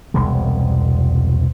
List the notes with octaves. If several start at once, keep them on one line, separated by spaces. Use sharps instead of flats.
E1 C2 C3 G#3